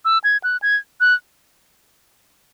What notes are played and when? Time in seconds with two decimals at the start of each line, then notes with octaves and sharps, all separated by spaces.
0.05 E6
0.24 G#6
0.44 F#6
0.62 G#6
1.01 F#6